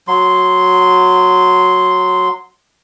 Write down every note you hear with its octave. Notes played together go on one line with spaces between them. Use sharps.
F#3 C6